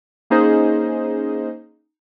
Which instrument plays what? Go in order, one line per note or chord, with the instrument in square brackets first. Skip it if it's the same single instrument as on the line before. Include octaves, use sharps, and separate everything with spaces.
[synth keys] A#3 C#4 D#4 G#4 C5 D#5